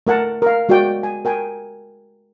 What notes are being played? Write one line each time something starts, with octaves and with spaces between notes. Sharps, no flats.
A3 A#4 F#5 A5
A#4 F5
G#3 F#4 A#4 D5 G5
G#5
A#4 G5 G#5